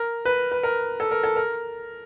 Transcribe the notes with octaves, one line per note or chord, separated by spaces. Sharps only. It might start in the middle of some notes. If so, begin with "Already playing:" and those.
Already playing: A#4
B4
B4
A#4
A4
A#4
A4
A#4